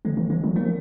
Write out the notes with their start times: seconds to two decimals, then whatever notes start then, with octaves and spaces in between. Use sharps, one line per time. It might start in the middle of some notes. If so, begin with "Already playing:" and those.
0.05 D3 A3
0.17 D#3
0.30 D#3 A3
0.44 F3
0.56 F3 A#3